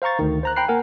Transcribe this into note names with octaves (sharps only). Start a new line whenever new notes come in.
C5 F5 A#5 C#6 A6
D2 D#3
C5 A#5 F#6
G5 A#5 B5 F#6 C7
A#3 A#4 F#5 G#5